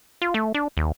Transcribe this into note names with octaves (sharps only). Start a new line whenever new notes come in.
F4
A3
D4
D#2